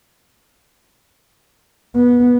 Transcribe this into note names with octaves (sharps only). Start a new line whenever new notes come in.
B3